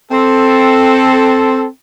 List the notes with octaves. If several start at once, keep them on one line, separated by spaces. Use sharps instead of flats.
C4 A4